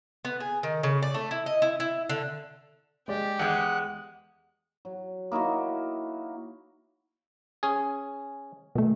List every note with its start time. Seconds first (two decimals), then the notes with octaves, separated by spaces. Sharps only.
0.25 B3
0.40 G#4
0.63 D#3
0.83 C#3
1.02 D5
1.14 A3
1.31 E4
1.46 D#5
1.62 E4
1.80 E4
2.09 D3
3.08 G#3 G4 D5
3.39 E2 G#3 F#5 G6 C#7
4.85 F#3
5.32 A#3 D#4 E4 F#4
7.63 C#4 G#4
8.75 B2 A3